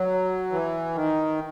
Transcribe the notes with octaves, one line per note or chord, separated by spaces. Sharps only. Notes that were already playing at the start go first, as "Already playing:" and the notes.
Already playing: F#3
E3
D#3